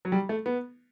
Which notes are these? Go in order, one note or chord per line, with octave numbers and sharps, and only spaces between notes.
F#3
G3
A3
B3